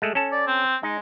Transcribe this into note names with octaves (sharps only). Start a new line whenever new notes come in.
G#3 A3 A4
C#4 A4 A5
D5
C4
G#3 D#4